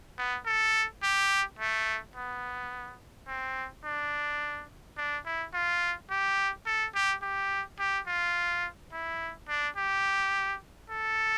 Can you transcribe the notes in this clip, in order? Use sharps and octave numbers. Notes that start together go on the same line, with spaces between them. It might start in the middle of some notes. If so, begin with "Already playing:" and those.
B3
A4
G4
A3
B3
C4
D4
D4
E4
F4
G4
A4
G4
G4
G4
F4
E4
D4
G4
A4